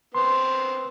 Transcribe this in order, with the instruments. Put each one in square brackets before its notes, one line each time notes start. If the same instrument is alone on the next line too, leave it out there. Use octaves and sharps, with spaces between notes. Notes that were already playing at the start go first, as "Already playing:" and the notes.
[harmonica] B3 C4 [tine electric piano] C6